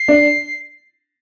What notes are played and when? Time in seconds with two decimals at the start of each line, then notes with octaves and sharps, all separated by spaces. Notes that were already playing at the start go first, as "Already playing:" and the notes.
Already playing: C7
0.08 D4